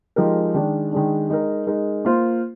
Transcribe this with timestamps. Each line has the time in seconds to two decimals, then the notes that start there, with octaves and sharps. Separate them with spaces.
0.16 F3 G#3 D#4 G4 A#4
0.54 D#3 G#3 D4
0.92 D#3 G#3 D4
1.29 G#3 D#4 A#4
1.67 G#3 D#4 A#4
2.05 A#3 F4 C5